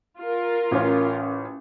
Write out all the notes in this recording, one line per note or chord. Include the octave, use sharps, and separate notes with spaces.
F4 A#4
A1 C#4